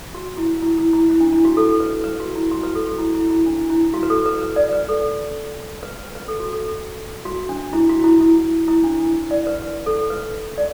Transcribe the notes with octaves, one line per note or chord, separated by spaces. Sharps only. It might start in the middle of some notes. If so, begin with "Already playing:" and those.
F#4
E4
E4
E4
E4
E4
D4
E4
F#4
A4
B4
B4
F#4
E4
F#4
B4
A4
F#4
E4
E4
E4
D4
E4
F#4
B4
A4
B4
B4
D5
B4
A4
B4
B4
B4
A4
F#4
A4
F#4
D4
E4
F#4
E4
E4
E4
D4
E4
D5
B4
B4
A4
B4
D5